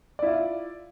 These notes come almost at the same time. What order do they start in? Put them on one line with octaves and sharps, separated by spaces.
D5 E4 F4